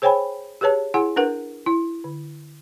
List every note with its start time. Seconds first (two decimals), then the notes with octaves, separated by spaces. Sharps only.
0.02 G#4 C5 C#5 G5 G#5 B5
0.61 G4 G#4 B4 C#5 A5
0.94 E4 G#4 F#5 G#5
1.16 D4 A#4 B4 F#5
1.66 E4
2.04 D3